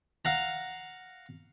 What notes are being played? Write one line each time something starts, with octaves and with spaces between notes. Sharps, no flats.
F5 F#5 A#5